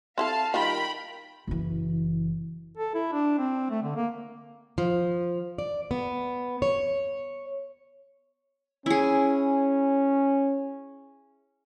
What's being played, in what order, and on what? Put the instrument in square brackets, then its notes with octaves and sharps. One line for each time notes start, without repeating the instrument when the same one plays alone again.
[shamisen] C4 E4 A4 [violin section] F5 A5
[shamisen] D#3 G3 F4 [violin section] A#4 G5 B5
[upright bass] F#1 E3
[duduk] A4
E4
D4
C4
A3
D3
A#3
[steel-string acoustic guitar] F3
D5
B3
C#5
[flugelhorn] C#4 [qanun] E4 G#4